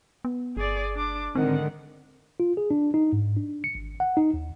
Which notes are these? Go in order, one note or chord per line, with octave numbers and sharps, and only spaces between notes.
B3
G1 G#4 D5
D4 D6
G#2 D3 D#3 C4 F#5
F4
G#4
D4
D#4
G#2
D4
C#7
G#1
F#5
D#4
D#2